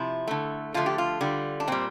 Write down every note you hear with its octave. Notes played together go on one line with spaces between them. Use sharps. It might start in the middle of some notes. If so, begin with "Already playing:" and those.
Already playing: C3 F3 E4
D3 A3
D3 F3 A3 F4
G4
F4
D3 G3
D4
A#2 G3 C4